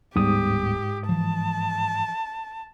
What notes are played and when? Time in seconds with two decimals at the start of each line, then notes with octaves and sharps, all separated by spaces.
0.16 D1 G#2 G3 B3 G4 D#6
1.09 E3 F3 A5